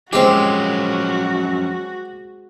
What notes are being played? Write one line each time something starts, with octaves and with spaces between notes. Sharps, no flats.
F3 F#3 G#3 C4 C#4 F#4 G4